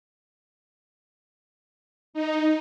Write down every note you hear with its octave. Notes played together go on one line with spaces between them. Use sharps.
D#4